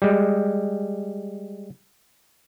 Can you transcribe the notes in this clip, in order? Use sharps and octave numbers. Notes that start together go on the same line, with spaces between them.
G3 G#3